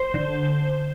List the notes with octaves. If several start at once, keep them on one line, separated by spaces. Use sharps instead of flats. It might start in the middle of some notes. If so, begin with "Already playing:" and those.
Already playing: C5
D3